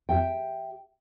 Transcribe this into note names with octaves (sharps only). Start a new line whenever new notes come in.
G4 E5 G5